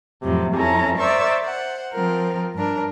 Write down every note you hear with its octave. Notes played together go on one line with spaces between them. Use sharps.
F2 A2 C3 F3 F#3
F2 C#4 E4 A4 A#5
A#4 C5 D5 E5 C#6 E6
C5 F#5
F3 C4 A#4
G2 D4 A#4